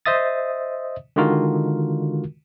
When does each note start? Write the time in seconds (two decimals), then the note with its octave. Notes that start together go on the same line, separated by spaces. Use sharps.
0.06 C5 D#5 E5 D#6 A6
1.16 D3 D#3 G#3 F4 F#4 A#4